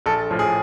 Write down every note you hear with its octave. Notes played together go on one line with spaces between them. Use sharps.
A#1 A4
A2 F3
G#4